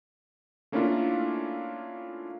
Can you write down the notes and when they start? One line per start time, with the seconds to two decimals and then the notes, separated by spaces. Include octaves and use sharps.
0.72 A3 A#3 C#4 D4 E4 F4